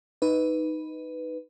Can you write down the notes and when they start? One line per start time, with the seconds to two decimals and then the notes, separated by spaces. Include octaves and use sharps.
0.22 D#4 B4